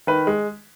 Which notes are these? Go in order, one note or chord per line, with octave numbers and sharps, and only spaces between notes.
D#3 B4
G#3